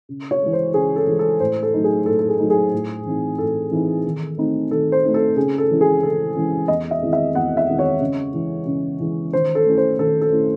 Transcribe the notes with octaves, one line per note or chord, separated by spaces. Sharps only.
C#3
C#5
E3 G#3
C5
C#3 G#4
A4
E3 G#3
A4
A2 C5
A4
F#3 A3 D#4
G#4
A2 A4
A4
G#4
F#3 A3 D#4
G#4
A2
E3 C4 D#4
A2 A4
E3 C4 D#4
D#3
A3 C4 D#4
D#3 A4
C5
A3 C4 D#4
A4
C#3 G#4
A4
E3 G#3 C#4 E4
G#4
C#3 A4
E3 G#3 C#4 E4
E2 D#5
E5
D#3 G#3 C4 E4
E5
E2 F#5
E5
D#3 G#3 C4 E4
C#5
C#3
E3 G#3
C#3
E3 G#3
D#3 C5
A4
A3 C#4 E4
C5
D#3 A4
A4
A3 C#4 E4